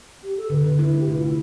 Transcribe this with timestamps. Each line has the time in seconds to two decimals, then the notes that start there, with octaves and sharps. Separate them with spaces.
0.23 G4
0.37 A4
0.50 D3 B4
0.64 D3
0.79 E4
0.94 A3
1.00 G4
1.08 C3 F4
1.21 C3 E4